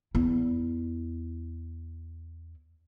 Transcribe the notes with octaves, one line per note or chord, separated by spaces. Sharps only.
E2 E4